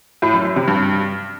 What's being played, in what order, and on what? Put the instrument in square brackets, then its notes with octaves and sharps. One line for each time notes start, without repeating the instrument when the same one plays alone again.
[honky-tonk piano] A2
F#2
F#2
C3
G2